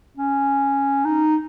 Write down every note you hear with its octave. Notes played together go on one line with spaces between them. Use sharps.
C#4
D#4